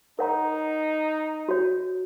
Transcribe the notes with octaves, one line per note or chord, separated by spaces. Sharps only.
D#4 A#4 C#5 F#5 A#5
F#4 C#5